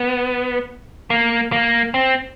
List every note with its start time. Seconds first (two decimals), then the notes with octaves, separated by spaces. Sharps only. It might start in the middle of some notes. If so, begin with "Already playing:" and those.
Already playing: B3
1.10 A#3
1.52 A#3
1.94 C4